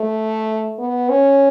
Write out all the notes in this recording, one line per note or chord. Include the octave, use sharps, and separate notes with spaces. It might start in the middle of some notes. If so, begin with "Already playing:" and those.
Already playing: A3
B3
C#4